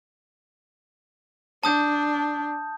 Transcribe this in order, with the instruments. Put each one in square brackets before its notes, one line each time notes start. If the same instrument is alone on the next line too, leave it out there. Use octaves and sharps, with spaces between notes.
[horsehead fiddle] D4 [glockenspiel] A5 D#6 G6